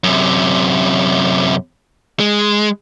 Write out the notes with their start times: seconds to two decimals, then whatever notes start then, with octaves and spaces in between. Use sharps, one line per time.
0.04 F#2 C3
2.20 G#3